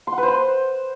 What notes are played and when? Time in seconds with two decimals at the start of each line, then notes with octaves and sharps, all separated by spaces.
0.07 C6
0.12 F#5
0.18 B4
0.23 C5
0.28 C6